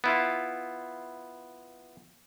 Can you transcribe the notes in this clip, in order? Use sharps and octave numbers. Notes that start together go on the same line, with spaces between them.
B3 E4 F4